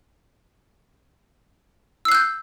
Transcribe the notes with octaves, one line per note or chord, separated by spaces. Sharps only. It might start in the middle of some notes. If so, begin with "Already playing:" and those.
E6 F#6 G6 C7